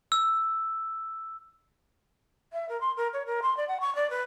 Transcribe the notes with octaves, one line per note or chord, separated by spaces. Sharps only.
E6
E5
A#4
C6
A#4
C#5
A#4
C6
D5
F#5
C#6
D5
B4